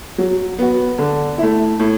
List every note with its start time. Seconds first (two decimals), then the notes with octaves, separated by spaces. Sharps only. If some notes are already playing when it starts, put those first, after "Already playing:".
0.18 F#3
0.59 B3 F#4
0.98 D3
1.38 A3 E4
1.79 A2